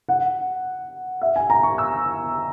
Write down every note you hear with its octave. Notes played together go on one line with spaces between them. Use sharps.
F#5
E5
G#5
A#5
C#6
E6